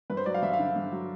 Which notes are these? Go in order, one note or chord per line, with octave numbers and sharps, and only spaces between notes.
G2 B4
C5
F#3 D5
F5
G2 E5
F5
D3
G2
F#3